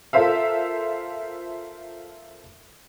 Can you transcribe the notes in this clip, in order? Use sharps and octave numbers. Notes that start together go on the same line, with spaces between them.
F4 A4 A#4 C5 E5 F5